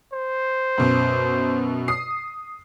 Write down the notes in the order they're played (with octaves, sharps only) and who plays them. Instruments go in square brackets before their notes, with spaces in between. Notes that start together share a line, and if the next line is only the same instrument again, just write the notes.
[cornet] C5
[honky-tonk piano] F#2 B2
D#6 C7